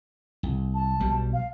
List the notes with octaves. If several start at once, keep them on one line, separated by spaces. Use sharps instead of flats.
C2
A5
B1 B2 G3
F5